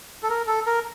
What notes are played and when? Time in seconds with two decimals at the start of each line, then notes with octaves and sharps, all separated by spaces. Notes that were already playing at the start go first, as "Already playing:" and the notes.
0.23 A4
0.29 A#4
0.47 A4
0.66 A#4